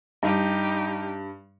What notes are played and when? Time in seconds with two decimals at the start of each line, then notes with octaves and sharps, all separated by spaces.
0.23 G2 D#4 G4